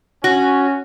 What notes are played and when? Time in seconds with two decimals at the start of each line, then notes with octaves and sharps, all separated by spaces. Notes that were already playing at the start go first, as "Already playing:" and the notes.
0.24 C#4 F#4